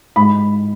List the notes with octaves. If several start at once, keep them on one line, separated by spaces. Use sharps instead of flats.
G#2 B5